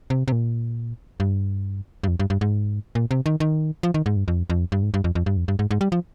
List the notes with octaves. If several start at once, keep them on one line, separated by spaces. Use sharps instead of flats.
C3
C3
A#2
G2
G2
F2
G2
G2
G#2
A#2
C3
D#3
D#3
F3
D#3
G#2
G2
F2
F2
G2
G#2
G2
F2
F2
G2
F2
G2
G#2
G#2
G3
F3